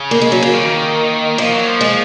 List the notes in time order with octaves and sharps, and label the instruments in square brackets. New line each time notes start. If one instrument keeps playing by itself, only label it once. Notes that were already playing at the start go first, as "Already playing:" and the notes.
Already playing: [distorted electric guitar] C#3
[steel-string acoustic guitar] A#3
G#3
F#3
A#3
[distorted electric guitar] D#3
[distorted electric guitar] F3 [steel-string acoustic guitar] A#3
[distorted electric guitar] F#3
F3
[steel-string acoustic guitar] G#3